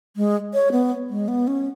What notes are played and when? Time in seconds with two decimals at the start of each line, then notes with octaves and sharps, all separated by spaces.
0.16 G#3
0.54 C#5
0.72 B3
1.09 G#3
1.28 B3
1.47 C#4